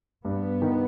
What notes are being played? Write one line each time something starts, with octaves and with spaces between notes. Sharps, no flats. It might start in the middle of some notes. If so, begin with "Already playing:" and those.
G2 B3
D#3